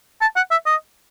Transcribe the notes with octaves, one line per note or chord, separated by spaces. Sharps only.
A5
F#5
E5
D#5